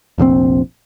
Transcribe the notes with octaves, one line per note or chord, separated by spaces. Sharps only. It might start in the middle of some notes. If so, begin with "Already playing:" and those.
F1 A#1 C3 C4